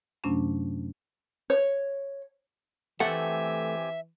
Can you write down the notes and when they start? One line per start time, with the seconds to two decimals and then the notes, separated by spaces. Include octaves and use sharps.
0.24 F#2 C3 F#3 A3 C#4 D4
1.50 C#5
3.00 E3 A3 C4 G4 A4 E5 F#5 G#5